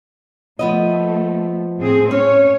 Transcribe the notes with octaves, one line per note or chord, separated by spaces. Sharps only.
F3 A3 B3 D#5
A2 C4 G#4
C#4 C#5